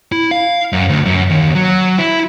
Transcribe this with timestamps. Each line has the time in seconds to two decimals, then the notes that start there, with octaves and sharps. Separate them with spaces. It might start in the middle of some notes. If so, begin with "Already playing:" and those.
0.12 E4
0.31 F5
0.73 F#2
0.89 D2
1.05 F#2
1.30 D#2
1.55 F#3
1.99 E4